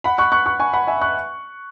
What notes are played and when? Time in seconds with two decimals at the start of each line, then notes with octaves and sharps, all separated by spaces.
0.04 F#5 B5
0.18 C#6 F#6
0.32 C#6 F#6
0.46 C#6 F#6
0.60 G#5 C#6
0.73 F#5 B5
0.87 E5 G#5
1.01 C#6 F#6